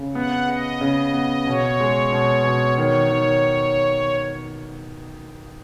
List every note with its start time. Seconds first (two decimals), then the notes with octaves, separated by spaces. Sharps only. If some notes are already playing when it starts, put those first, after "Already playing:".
Already playing: C#3
0.15 B3 F#5
0.48 G#4 D#5
0.81 C#3
1.14 B3
1.47 B2 C#5
1.80 G#3
2.13 B2
2.45 B2
2.78 D#3 C#5
3.11 D#3